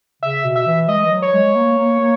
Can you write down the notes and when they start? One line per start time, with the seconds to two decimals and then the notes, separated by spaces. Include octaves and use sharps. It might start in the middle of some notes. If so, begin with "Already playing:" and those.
0.22 C#3 E5
0.44 B2
0.56 E5
0.67 E3
0.88 G#3 D#5
1.05 E3
1.11 F#3
1.22 C#5
1.33 G#3
1.55 A#3
1.78 A#3
2.00 A#3